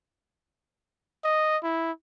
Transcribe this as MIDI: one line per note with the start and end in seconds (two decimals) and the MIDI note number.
1.24 1.57 75
1.63 1.92 64